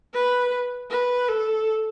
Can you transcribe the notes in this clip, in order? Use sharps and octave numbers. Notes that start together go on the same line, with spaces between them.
B4
B4
A4